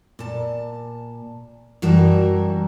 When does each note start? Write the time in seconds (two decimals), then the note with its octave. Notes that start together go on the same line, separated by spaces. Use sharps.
0.19 A#2 A5
1.82 F#2 E3 G3 F#4 A#4 A5